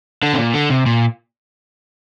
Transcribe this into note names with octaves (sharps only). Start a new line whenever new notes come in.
D3
C3
A#2
D3
C3
A#2